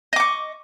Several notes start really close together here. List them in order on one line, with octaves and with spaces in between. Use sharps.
D#5 D6 C#6